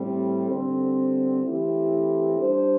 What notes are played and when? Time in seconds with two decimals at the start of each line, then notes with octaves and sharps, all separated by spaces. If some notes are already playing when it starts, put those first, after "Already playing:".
Already playing: A2 G3 C4
0.50 D3 G3 C4
1.45 E3 A3 C4 E4 G4
2.39 G3 D4 C5